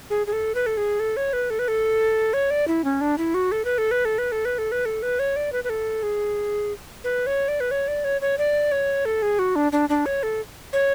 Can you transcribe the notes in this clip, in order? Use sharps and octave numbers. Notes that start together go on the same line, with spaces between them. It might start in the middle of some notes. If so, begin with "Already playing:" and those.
G#4
G#4
A4
B4
A4
G#4
A4
C#5
B4
A4
B4
A4
C#5
D5
E4
C#4
D4
E4
F#4
A4
B4
A4
B4
A4
B4
A4
B4
A4
B4
A4
B4
C#5
D5
B4
B4
A4
G#4
B4
C#5
D5
B4
C#5
D5
C#5
C#5
D5
C#5
A4
G#4
F#4
D4
D4
D4
C#5
A4
C#5